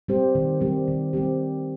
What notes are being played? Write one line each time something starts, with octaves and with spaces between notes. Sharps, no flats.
G3 C4 G4 C5
D#3
G3 C4 G4
D#3
G3 C4 G4